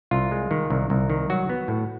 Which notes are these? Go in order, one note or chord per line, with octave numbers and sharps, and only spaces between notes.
C2 F4
G#3
D#3
C2
C2
D#3
F#3 F#4
B3
A2